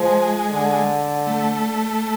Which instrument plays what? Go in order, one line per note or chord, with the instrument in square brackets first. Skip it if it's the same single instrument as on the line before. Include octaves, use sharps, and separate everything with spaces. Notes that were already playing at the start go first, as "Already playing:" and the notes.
Already playing: [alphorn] F3 [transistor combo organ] G#3
[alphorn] D3
[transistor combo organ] A3